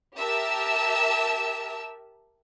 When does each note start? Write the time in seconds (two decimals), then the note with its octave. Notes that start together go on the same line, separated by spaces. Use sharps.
0.16 G4 A#4 E5 A5 E6